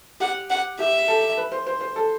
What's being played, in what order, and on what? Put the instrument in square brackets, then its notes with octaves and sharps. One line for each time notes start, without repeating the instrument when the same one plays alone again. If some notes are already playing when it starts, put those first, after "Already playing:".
[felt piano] G4 [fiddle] F#5
[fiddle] F#5
[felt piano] G4 [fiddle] E5
[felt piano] A4
B4
C5
C5
C5
A4